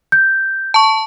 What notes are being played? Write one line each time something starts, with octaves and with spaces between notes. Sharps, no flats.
G6
A5 C#6